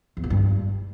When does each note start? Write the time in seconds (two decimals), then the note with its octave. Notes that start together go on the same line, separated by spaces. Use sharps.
0.17 E2
0.24 B2
0.30 G2